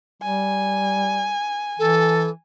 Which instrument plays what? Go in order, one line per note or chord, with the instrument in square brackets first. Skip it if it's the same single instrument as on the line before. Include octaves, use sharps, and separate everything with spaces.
[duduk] G3 [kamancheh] G#5
[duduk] E3 [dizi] A4